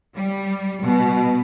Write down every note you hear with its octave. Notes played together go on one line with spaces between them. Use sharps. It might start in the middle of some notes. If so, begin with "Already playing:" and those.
G3
B2